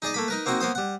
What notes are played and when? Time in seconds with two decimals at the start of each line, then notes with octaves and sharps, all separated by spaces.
0.02 D#4 G#4 D5 D#5
0.14 A3 A#3 B5
0.28 D#4 A#4 B4
0.46 A#3 C4 D#4 F#4
0.61 A#3 B3 C5 D#6
0.75 G3 F#5